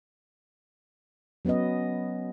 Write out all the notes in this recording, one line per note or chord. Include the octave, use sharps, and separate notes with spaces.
F#3 B3 C#4 B4 D#5